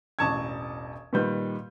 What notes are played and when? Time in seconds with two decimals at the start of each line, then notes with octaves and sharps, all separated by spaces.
0.19 E1 A1 A5 C#6 G#6
1.13 A#2 D#3 G3 B4 G6